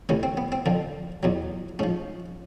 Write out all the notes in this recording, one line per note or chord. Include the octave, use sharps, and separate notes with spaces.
D2 C3 E3 C#4
C4
B3
C4
F2 D3 F3
E2 B2 F#3
G#2 F3 C#4